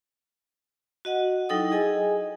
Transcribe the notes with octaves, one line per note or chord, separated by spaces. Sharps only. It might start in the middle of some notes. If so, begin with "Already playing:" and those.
F#4 D#5 F#5
F#3 D#4 E4 A4 G5 D#6
G#4 D#5 G#5